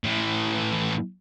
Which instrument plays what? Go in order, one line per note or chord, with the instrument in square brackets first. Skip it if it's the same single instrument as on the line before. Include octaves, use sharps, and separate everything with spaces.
[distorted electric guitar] A2 E3